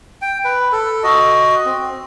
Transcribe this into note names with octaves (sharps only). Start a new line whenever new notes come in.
G5
B4
A4
F#4 D#5
C4